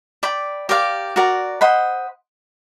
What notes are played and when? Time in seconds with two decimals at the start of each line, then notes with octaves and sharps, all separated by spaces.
0.23 D5 G5 B5
0.69 G4 A#4 D5 F5
1.16 F#4 A#4 D5
1.61 C5 D#5 F#5 B5